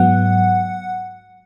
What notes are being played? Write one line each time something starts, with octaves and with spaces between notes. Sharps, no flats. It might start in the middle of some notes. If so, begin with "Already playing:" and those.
Already playing: G#2 F#3 B3 F#5